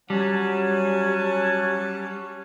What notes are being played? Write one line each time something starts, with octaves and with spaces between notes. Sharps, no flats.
F#3 G3 C#4 F#5 G#5 A5